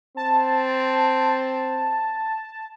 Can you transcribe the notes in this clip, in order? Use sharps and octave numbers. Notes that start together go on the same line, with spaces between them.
C4 A5